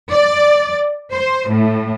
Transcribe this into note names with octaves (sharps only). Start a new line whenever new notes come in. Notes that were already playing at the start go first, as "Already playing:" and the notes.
D5
C5
A2